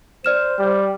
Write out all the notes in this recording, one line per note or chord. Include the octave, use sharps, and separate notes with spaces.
C5 D5 F6 E7
G3